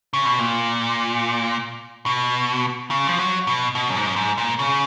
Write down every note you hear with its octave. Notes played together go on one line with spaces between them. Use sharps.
C#3
B2
A#2
B2
C#3
F3
F#3
B2
B2
F#2
G#2
F#2
G#2
A#2
C#3